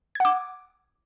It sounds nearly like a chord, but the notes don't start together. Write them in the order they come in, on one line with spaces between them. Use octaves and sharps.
G#6 F#5 D6